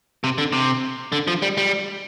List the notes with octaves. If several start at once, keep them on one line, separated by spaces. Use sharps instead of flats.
C3
D3
C3
D3
F3
G3
G3